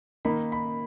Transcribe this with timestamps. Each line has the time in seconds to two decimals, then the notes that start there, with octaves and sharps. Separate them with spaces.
0.25 D#3 A#3 D#4 B5
0.52 B5